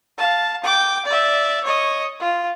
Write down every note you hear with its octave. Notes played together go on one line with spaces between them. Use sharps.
F5 A5
G5 D6
D5 E5
C#5 D#5
F4